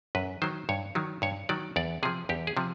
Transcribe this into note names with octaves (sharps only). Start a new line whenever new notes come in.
F#2 B4
D#3 F#3 C5
G2 C#5
D#3 F#3
G2 C#5
D#3 F#3 D5
E2 D5
C3 F3 G#4
E2 G4
G#4
C3 F3